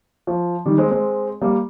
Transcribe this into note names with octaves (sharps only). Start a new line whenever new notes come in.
F3
D#3 G3
G#3 C4
G#3 C4
G3 A#3